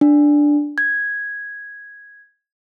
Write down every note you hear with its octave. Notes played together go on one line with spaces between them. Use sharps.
D4
G#6